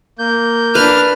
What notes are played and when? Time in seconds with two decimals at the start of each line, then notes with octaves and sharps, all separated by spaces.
0.19 A#3 G6
0.75 D4 B4 F6